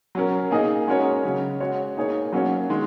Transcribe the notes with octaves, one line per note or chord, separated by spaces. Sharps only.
F#3 C#4 A#4
A#3 D#4 G#4 D#5
G#3 C#4 F#4 A#4 C#5
C#3 F#3 C#4
G#3 F#4 C#5
A#3 D#4 G#4 C#5
F#3 A#3 C#4 F#4 C#5
D#3 G#3